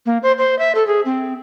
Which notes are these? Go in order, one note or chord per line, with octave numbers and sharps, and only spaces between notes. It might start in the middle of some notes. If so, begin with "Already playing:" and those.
A#3
C5
C5
E5
A4
G#4
C4